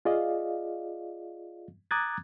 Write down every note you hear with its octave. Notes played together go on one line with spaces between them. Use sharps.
F4 G#4 D5 D#5 F5
A#5 D6 D#6 F#6 G#6 A6